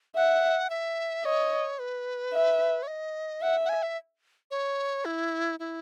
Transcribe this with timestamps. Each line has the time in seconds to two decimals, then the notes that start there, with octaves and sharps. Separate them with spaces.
0.16 E5 F#5
0.70 E5
1.25 C#5 D#5
1.79 B4
2.33 E5
2.83 C#5
2.87 D#5
3.42 E5 F#5
3.65 F#5
3.69 G#5
3.83 E5
4.51 C#5
5.05 E4
5.60 E4